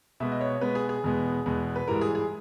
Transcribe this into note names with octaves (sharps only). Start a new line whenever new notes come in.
B2 G#3 B3 E5
D#5
C#5
B2 G#3 B3 B4
G#4
G#4
E2 B2 G#3 B3
E2 B2 G#3 B3
B4
G#2 E3 G3 A#4
G#4
G#4